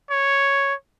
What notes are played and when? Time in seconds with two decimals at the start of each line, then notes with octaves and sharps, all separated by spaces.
0.10 C#5